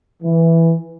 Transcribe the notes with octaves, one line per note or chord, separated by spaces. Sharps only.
E3